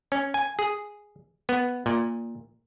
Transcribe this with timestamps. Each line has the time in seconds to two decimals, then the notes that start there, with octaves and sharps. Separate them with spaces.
0.12 C#4
0.34 G#5
0.59 G#4
1.49 B3
1.86 A#2